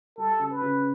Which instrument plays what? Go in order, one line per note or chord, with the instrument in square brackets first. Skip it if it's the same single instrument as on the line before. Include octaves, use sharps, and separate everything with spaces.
[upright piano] G3 [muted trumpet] A4
[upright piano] C#3
[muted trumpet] B4
[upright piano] C#3